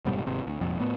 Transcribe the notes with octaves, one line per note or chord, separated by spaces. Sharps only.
F1 G#2 B2 G3
G#1 C3
D2
F1 A#1 F2
A2 B3